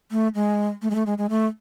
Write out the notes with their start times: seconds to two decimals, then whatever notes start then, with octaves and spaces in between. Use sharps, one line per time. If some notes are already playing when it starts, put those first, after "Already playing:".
0.11 A3
0.35 G#3
0.82 A3
0.90 G#3
0.95 A3
1.06 G#3
1.18 G#3
1.30 A3